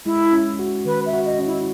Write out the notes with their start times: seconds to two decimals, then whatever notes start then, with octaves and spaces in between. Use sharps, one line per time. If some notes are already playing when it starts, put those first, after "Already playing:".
0.06 G#3 E4
0.33 C#4
0.59 F#4
0.86 D#3 B4
1.06 E5
1.13 F#4
1.26 D#5
1.39 C#4
1.46 E4